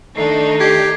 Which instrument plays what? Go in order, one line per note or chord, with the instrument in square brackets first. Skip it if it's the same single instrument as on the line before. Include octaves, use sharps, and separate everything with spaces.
[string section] D#3 D4 D#4 [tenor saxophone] A3 [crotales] C7
[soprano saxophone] G4 [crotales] G#6 C7